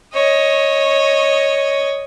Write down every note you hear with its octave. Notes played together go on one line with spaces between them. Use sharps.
C#5 D#5